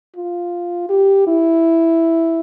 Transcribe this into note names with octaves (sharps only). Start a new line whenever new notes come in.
F4
G4
E4